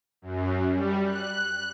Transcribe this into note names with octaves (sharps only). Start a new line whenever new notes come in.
F#2
G3
F#6